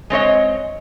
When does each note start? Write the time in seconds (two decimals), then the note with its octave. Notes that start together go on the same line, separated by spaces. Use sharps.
0.10 G#3 C4 C#5 D#5